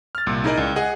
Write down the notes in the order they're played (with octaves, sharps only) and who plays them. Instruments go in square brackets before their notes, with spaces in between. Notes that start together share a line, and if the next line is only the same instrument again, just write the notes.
[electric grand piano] F6 A6
C2 A#2
D#4 E4 G#4 A#4 D5 D#5
C#2
G#4 D#5 F#5